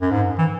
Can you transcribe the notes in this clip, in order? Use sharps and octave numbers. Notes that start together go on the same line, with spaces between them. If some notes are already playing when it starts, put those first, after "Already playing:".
F#2
G#2
E3